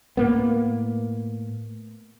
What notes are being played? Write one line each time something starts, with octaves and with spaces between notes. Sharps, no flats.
A2 A#3 B3